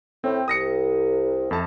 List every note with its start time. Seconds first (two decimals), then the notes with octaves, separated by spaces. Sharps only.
0.24 A2 C4 G5
0.48 C2 D#6 A#6 C#7
1.51 F2 A3 A5